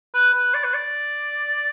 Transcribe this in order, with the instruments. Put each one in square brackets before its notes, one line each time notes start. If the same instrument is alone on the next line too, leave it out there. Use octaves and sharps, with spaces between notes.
[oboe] B4
B4
D5
B4
D5